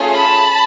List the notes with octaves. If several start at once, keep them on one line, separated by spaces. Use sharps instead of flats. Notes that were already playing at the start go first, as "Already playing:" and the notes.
Already playing: A3 C#4 F4 G#4
A5 B5